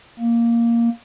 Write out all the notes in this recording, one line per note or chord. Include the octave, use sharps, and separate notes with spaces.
A#3